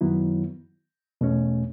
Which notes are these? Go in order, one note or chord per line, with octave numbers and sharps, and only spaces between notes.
F#2 D#3 F#3 B3 E4
E2 B2 A3 C#4